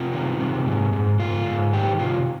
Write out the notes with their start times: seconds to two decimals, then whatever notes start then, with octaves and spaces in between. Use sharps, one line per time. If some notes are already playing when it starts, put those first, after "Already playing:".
Already playing: C3 F4
0.13 D#3
0.40 C3
0.66 G#2
0.93 G#2
1.19 G#2 F4
1.46 G#2
1.73 D#3 G4
1.99 C3 F4